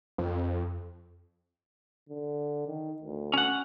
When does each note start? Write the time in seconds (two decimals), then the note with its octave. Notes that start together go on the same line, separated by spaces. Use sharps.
0.18 F2
2.09 D3
2.67 D#3
3.02 D2
3.34 C#4 F#5